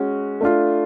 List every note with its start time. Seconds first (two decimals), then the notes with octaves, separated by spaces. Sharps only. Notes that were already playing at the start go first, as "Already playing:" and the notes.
Already playing: G#3 C#4 F#4
0.41 A3 D4 F4